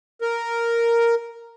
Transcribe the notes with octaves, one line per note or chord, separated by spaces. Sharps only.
A#4